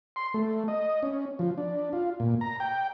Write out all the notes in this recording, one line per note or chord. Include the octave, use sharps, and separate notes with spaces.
C6
A3
D#5
C#4
F3
D4
F4
A#2
A#5
G5